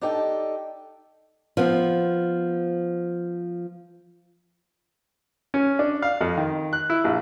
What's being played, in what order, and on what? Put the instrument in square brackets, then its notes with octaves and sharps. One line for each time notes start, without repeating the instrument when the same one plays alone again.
[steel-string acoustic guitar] D4 D#4 G4 A4 D5 G5
[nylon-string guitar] F3 B3 C4
[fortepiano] C#4
D4
F5
F2
D#3
F#6
E4
A#1